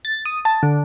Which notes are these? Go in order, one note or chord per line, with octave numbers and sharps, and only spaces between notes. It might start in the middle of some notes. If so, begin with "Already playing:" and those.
A6
D#6
A5
D3